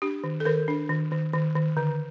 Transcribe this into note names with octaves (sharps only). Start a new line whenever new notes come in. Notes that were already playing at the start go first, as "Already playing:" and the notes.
D4 G4
D#3
A4
D#3 A#4
D4
D#3
D#3
D#3
D#3
D3